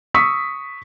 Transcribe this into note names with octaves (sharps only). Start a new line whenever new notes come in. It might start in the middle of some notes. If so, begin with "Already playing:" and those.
C#6 D#6 E6 B6